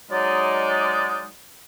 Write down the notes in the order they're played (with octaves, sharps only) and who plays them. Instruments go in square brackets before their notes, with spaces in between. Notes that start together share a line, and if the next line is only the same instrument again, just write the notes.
[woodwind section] F#3 G#3 D#4 D5